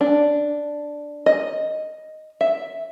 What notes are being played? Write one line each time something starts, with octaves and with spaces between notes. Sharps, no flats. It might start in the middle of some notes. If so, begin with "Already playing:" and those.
D4
D#5
E5